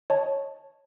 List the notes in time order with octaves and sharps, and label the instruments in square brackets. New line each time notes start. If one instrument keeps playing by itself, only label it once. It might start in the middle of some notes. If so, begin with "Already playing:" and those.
[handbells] C#5 D#5 A5